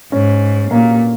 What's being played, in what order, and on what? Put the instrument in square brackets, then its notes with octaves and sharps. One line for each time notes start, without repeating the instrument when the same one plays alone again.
[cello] G#2 [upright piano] C#4
[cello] A#2 [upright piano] A#3